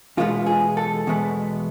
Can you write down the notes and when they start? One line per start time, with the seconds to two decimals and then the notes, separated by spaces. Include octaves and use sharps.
0.17 E2 B2 G#3 B3 F4
0.47 G#4
0.77 A4
1.07 E2 B2 G#3 B3